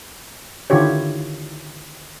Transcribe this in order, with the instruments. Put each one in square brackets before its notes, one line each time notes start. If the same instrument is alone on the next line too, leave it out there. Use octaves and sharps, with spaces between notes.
[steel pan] D3 D#3 E4 F4 G4 C#5